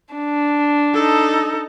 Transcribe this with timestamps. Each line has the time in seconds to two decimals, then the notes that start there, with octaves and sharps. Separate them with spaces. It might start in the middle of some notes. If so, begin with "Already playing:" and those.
0.15 D4
0.94 D#4 A4